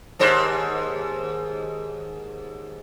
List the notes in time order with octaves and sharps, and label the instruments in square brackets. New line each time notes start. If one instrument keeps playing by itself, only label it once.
[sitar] D#2 G#2 C5